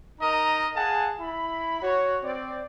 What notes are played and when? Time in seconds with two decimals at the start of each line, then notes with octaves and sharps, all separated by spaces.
0.20 D#4 A#4 D#5 A#5
0.76 G#4 F5 F#5 G#5 A5
1.20 E4 B5
1.82 F#4 C#5
2.24 C4 D5